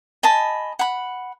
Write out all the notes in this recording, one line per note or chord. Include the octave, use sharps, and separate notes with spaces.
D#5 G#5 A5 B5
F#5 B5